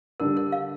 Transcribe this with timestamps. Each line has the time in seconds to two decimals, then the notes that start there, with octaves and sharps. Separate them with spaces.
0.20 D3 G3 D4 A#4
0.37 A#4
0.52 F5